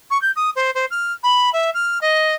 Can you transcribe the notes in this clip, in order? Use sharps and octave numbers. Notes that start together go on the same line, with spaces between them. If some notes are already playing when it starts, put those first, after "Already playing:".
C#6
G6
D#6
C5
C5
F6
B5
E5
F6
D#5